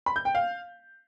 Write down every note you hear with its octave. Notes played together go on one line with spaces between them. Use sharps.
B5
G6
G5
F5